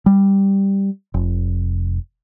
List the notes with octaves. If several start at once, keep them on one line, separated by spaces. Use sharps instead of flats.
G3
F1